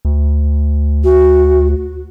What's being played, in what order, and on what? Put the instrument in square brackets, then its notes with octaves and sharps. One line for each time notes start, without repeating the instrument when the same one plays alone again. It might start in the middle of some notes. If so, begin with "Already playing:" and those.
[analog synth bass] D2
[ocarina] F#4